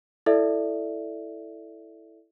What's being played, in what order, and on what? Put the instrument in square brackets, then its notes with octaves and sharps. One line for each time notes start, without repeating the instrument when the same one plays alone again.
[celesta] E4 A4 D5 E5